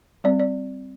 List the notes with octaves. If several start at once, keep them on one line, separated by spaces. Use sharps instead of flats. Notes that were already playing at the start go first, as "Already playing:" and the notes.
G3 C4 D5
D5